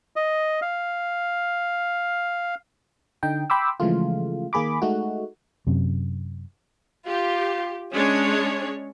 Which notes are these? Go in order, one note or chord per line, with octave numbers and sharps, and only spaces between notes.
D#5
F5
D3 D#4 G5
G5 B5 C6 D6 E6
C#3 E3 F3 G#3 A3 F4
D#3 A#3 G#4 B5 D6
G#3 A3 D#4 F#4
F#2 C3
F4 G4
G#3 C#4 D4 C#5